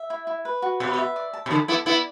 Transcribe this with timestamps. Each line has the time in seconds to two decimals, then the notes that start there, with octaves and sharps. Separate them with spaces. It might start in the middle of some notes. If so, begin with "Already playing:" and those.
Already playing: E5
0.10 E4
0.27 E4
0.45 B4
0.62 F#4
0.80 B2 B4
0.98 E5
1.16 D5
1.33 A5
1.46 B2
1.51 D3 A4
1.68 B3 E4 D6
1.86 B3 E4 D5